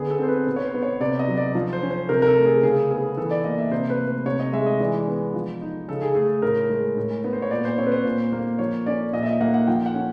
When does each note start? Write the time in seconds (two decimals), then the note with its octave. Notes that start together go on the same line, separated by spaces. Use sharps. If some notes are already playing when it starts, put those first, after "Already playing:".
Already playing: D3 B3 G#4
0.11 A4
0.19 C4 C5
0.28 B4
0.47 B2 B4
0.56 C#5
0.65 C5
0.74 B3
0.83 C#5
1.00 C3 D5
1.19 D#5
1.28 F#3
1.37 D5
1.55 F3
1.73 C5
1.82 C#4
1.91 C5
2.09 C3 A#4
2.22 A#4
2.27 A4
2.36 A3
2.45 G#4
2.63 C#3 G#4
2.91 B3 G#4
3.17 E3 A4
3.31 D5
3.44 A#3 D#5
3.58 E5
3.71 C3 C5
3.90 B4
3.99 A3
4.08 C5
4.26 C3 C#5
4.40 D#5
4.53 G#3 E5
4.66 D#5
4.80 E3 D5
5.08 B3
5.34 F3
5.61 D#4
5.88 C#3 A4
6.02 G#4
6.15 A3 G#4
6.42 A2 A#4
6.69 G#3
6.97 A2
7.24 B3
7.33 C5
7.42 C#5
7.51 A#2 D5
7.65 C5
7.78 C4 C#5
7.86 B4
7.92 C5
8.05 A#2
8.33 A#3
8.59 F3 C#5
8.86 C#4 D5
9.13 A#2 D#5
9.23 E5
9.27 D#5
9.40 A#3 F#5
9.54 F#5
9.67 F3 G5
9.86 F#5
9.94 C#4